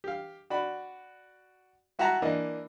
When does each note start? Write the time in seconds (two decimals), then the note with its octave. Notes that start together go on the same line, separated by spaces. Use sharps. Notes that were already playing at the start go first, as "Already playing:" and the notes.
0.04 G4 F5
0.50 F#4 D5 B5
1.99 E4 F#4 E5 F#5 A5 A#5
2.22 E3 A#3 D4 D#5